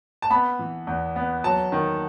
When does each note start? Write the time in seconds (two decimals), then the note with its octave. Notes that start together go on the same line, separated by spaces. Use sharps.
0.22 A5
0.30 B3 B5
0.59 E3
0.87 E2
1.16 B3
1.44 F#3 A5
1.72 D#3